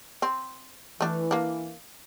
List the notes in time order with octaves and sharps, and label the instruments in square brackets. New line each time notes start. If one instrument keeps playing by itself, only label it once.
[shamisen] C4
[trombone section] E3 [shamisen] A3 D4
[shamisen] A#3 D4